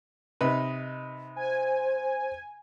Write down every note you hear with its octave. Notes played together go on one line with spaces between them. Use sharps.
C3 D#4 B4
C5 G#5